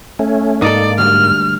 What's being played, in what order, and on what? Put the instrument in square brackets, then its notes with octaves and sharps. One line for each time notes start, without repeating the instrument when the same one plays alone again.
[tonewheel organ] A3 C#4
[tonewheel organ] G#2 A#3 [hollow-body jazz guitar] D#4 A4 [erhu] D5
[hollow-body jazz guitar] D2 G2 [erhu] F6